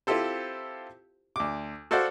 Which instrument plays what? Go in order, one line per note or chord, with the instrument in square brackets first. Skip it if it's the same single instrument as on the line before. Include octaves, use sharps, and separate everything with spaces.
[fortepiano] C4 E4 F4 G4 A4 C5
D2 D6
F#4 A4 C5 D5 F5 F#5